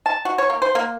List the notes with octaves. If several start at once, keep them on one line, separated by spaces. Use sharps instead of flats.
A5
F#4
C#5
A#3
C5
A#3